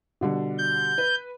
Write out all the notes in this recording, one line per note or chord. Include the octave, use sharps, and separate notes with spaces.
B2 D3 G3
G6
B4